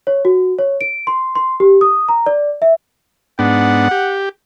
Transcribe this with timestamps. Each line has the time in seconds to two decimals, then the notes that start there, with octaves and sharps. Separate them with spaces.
0.07 C#5
0.25 F#4
0.59 C#5
0.81 D7
1.07 C6
1.35 C6
1.60 G4
1.81 D#6
2.08 A#5
2.26 D5
2.62 E5
3.39 G#2 B3 D4 F#5
3.91 G4